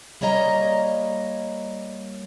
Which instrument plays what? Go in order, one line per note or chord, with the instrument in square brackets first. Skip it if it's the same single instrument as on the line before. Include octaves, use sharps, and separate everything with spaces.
[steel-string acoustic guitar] G3 A#3 C#5 D#5 A#5